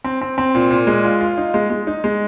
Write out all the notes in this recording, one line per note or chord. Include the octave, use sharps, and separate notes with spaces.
C4
C4
C4
A#2
A#2
G#3
F4
F4
D#4
G#3
G#3
D#4
G#3